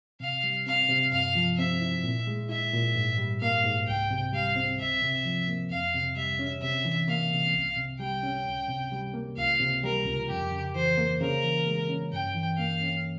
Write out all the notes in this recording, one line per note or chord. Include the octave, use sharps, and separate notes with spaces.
C3 F5
G3
C4 F5
C3
G2 F5
F3
C4 E5
E4
A#2
G#3
E4 E5
A#2
G#2
G3
A#3 F5
G#2
C2 G5
C3
G3 F5
C4
C#2 E5
C3
F3
A#3
F2 F5
C3
G3 E5
C#4
C3 E5
E3
A#3 F5
C3
C2
C3
G3 G5
C#4
C#2
C3
G3
A#3
C#2 F5
C3
G3 A#4
C#2
F2 G4
C#3
E3 C5
A#3
C#3 A#4
E3
G#3
C#4
G2 G5
E3
A#3 F5
C#4